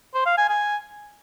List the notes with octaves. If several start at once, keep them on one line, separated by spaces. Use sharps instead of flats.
C5
F5
G#5
G#5